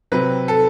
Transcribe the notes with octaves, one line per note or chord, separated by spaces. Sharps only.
C3 F#3 C4 B4
A4